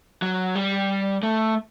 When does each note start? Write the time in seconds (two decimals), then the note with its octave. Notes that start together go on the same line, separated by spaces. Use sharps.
0.22 F#3
0.55 G3
1.23 A3